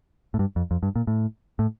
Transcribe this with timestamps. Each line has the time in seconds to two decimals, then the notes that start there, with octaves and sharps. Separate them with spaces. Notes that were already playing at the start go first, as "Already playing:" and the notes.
0.34 A2
0.39 G2
0.56 F2
0.71 F2
0.83 G2
0.96 A#2
1.07 A2
1.59 A2